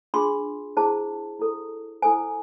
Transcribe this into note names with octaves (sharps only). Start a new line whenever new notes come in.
D4 F4 G#4 C6
E4 G#4 C5 A5
E4 A4 C5
E4 A4 C5 G#5